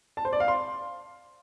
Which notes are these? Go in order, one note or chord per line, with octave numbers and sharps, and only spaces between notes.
A5
C5
D5
F5
C6